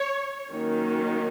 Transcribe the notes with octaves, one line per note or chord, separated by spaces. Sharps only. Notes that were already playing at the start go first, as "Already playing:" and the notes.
Already playing: C#5
D#3 F#3 A#3 C#4